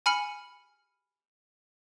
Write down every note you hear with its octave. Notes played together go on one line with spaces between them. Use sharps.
G#5 B5 F6 C#7 F#7